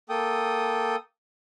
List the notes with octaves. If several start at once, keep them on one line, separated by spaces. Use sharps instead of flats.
A#3 A4 G5 D#6